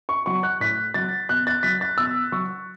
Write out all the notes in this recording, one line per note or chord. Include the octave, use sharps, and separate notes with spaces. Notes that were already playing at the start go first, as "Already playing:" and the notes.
C#6
F#3 C#6
F#6
A2 B6
F#3 A6
B2 F#6
A6
F#3 B6
A6
B2 E6
F#3 C#6